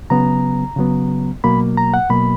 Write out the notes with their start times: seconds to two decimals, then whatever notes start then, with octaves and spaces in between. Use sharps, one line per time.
0.10 C#3 F#3 B3 A#5
0.76 C#3 F#3 B3
1.44 B2 F#3 A#3 B5
1.77 A#5
1.94 F#5
2.10 B2 F#3 A#3 B5